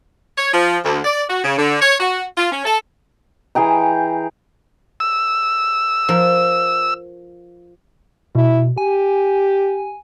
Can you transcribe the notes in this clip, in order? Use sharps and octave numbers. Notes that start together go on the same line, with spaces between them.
C#5
F3
D2
D5
F#4
C#3
D3
C#5
F#4
F4
C#4
A4
E3 G#4 G5 A#5
E6
F3 A#4
B2 E4
G4 G#5